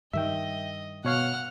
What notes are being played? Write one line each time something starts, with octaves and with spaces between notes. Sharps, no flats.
G2 D#3 D#5 E5 G5
B2 C#5 F5 F#5 F6